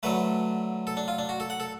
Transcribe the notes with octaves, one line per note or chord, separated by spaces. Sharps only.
D3 F#3 A3 B4
A4
D4
F4
D4
F#4
A4
F#5
A4